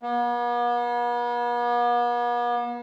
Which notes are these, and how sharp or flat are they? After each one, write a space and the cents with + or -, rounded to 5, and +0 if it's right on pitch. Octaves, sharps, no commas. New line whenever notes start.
B3 -45